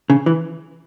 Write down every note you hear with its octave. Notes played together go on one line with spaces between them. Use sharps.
C#3
E3